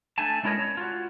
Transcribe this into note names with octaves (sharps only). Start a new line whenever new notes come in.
A3 D4 G#5 A5
G#3 C#4 E4 A#4 C#5 D#5
C#5
F4 F#4